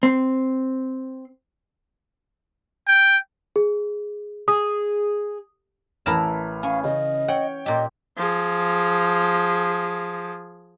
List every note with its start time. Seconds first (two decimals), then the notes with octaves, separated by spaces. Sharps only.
0.03 C4
2.88 G5
3.56 G#4
4.48 G#4 D#6
6.06 A1 E3 A#4 A5 B5 F6
6.63 C#4 F5
6.84 C#3 D#5
7.28 C#5 F#5 G5
7.66 A#2 G4 D#5
8.17 F3 G#4